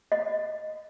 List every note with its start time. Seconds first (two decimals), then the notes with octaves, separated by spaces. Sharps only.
0.12 D#5